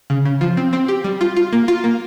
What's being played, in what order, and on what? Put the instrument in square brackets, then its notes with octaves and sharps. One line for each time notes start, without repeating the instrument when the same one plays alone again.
[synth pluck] C#3
C#3
F3
C4
C4
G4
G3
F4
F4
A#3
F4
A#3